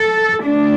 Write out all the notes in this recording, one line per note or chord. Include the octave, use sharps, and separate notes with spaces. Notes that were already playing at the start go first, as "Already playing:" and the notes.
Already playing: A4
D2 D3 A3 D4